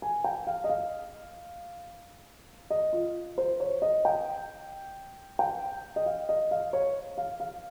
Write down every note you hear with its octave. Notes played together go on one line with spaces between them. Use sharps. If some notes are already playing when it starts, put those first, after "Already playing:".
G#5
G5
F5
D#5
F5
D#5
F4
C5
C#5
D#5
G5
G5
D#5
F5
D#5
F5
C#5
F5
F5